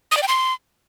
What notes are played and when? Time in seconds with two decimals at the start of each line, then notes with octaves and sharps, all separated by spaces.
0.12 D#6
0.17 D5
0.23 G5
0.28 C6